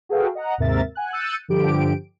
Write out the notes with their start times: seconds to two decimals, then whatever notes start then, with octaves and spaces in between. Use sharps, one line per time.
0.09 F#4 G#4 A4 B4 F5 G5
0.35 D#5 F#5 A#5
0.58 D#2 G#2 C3 A#4 E5 A6
0.95 F#5 G#5 F#6
1.13 E6 F#6 G6 A6 C#7 D#7
1.48 G2 D3 F3 G4 D7